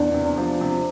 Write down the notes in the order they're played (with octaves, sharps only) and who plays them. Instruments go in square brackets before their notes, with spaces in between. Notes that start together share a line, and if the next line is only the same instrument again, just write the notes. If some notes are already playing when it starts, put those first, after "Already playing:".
Already playing: [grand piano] E2 [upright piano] D4
[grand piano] C3
F3
C3